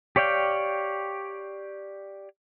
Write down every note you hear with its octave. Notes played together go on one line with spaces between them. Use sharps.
G4 C#5 D5 F5 G5